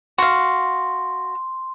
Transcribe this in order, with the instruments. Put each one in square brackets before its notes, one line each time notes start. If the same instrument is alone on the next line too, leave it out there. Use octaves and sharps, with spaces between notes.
[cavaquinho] F#4 F5 [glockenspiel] C6